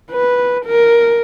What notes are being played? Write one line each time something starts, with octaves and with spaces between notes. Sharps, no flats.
B4
A#4